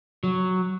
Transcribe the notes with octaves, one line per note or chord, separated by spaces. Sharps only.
F#3